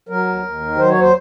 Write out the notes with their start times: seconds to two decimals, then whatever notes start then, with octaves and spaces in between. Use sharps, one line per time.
0.09 F#3 A#4
0.26 D#2
0.43 D#2
0.60 D#3
0.77 F#3 C5
0.89 C#5
0.95 D#2
1.00 C5